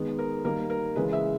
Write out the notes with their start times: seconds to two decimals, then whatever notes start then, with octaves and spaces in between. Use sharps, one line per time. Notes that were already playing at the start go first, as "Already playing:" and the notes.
Already playing: D#3 G#3 B3
0.19 A#4
0.44 D#3 G3 A#3 A#4
0.70 A#4
0.96 C#3 E3 G#3 B4
1.13 E5